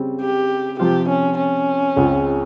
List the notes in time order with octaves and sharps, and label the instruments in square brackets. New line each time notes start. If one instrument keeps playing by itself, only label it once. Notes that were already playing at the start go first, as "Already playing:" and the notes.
Already playing: [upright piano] C#3 G3 C4
[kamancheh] G4
[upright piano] C3 F3 C4 F4 [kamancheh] G4
[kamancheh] C#4
C#4
[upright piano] C#2 C#3 G#3 C4 F4